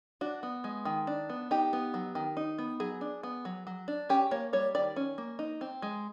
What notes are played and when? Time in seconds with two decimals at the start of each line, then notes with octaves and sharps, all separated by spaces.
0.21 D4 F#4
0.43 B3
0.64 G#3
0.85 D#3
1.07 D4
1.29 B3
1.51 D#4 G4
1.73 B3
1.94 F#3
2.15 D#3
2.37 D#4
2.58 B3
2.80 F#3 G#4
3.01 D4
3.23 B3
3.45 F#3
3.67 F#3
3.88 D4
4.09 C#4 G4
4.31 A#3 C#5
4.53 G3 C#5
4.75 D#3 D5
4.96 C#4
5.18 A#3
5.39 D#4
5.61 C4
5.82 G#3